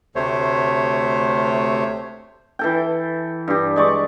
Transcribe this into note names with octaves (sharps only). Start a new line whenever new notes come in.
D2 C3 A3 C5 C#5
E3 A4 G5
G2 G4
G#3 D5 C#6